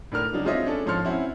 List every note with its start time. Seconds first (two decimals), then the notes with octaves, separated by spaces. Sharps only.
0.12 A2 D4 A#4 F6 F7
0.33 C#3 F#3 D4 D#4
0.45 G#3 C4 F4 C#5 D#5 E5
0.65 C#4 D4 A4
0.86 G#2 F3 C#5 C6 F6 C#7
1.05 C4 C#4 E4 F#4